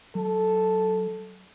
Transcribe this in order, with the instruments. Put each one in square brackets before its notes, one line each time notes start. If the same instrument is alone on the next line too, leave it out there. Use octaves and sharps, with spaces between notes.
[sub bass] F#3 [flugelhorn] A4